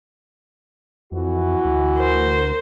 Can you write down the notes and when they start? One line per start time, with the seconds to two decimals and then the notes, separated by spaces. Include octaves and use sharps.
1.12 F2 E3 F#4
1.65 D2
1.97 A#4 C5